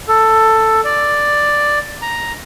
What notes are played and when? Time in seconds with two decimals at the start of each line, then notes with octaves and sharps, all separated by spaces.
0.08 A4
0.84 D5
2.02 A#5